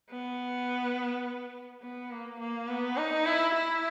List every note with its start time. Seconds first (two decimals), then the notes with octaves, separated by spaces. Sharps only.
0.10 B3
1.82 B3
2.11 A#3
2.40 A#3
2.69 B3
2.97 D#4
3.26 E4
3.55 E4